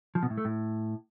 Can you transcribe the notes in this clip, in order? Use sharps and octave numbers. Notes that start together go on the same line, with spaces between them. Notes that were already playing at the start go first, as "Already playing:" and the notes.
F3
B2
A2
A3
A2